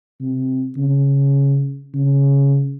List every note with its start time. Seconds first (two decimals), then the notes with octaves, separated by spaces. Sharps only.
0.21 C3
0.77 C#3
1.94 C#3